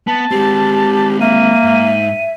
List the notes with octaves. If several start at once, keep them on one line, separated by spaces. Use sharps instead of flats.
B3 A5
G#3 C4 G4
A#3 E5 D#7
G#2